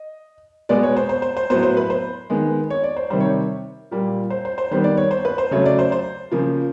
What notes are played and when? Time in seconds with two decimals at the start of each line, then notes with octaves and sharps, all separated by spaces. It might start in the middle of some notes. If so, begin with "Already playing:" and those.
Already playing: D#5
0.69 B2 G#3 B3 D5
0.83 C#5
0.96 C5
1.09 C5
1.22 C5
1.37 C5
1.50 A2 F#3 B3 C5
1.63 C5
1.77 B4
1.90 C5
2.30 D#3 G#3 B3
2.70 C#5
2.83 D5
2.97 C5
3.10 C3 D#3 G3 C5
3.20 C#5
3.91 A#2 G3 A#3
4.30 C5
4.45 C5
4.58 C5
4.71 D#3 G3 B3 C5
4.84 D5
4.97 C#5
5.11 C5
5.25 B4
5.38 C5
5.51 C#3 F#3 A3 C#5
5.66 D5
5.79 C5
5.92 C5
6.32 C#3 F3 A#3